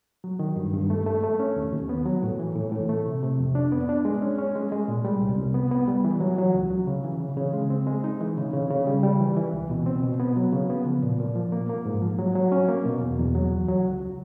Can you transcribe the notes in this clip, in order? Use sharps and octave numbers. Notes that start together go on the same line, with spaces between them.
F#3
D#3
G2
G2
A3
A3
A3
C#4
D#2
D#2
B3
F#3
A2
E3
A2
A2
A3
C3
C3
F2
D4
B3
D4
G#3
C#4
C#4
G#3
G#3
A#2
G3
C2
C2
B3
B3
G3
E3
F#3
F#3
C#2
F#3
C#3
E3
C#3
C#3
G#3
C4
G#3
D#4
E3
C#3
C#3
C#3
G3
G3
E3
E3
C#2
B2
C4
B2
B3
F#3
C#3
B3
F3
A#2
A#2
F3
A#3
A#3
G#2
F3
F#3
F#3
C#4
A#3
B2
E2
E2
F#3
C#2
F#3
C#2